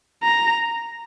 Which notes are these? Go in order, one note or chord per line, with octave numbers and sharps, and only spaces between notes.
A#5